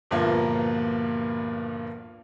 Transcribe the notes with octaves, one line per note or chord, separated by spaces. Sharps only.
D2 G2 A#2 F3 A#3 B3